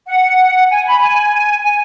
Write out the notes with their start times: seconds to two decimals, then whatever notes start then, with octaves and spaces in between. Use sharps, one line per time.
0.08 F#5
0.70 G#5
0.85 B5
1.01 G#5
1.63 G#5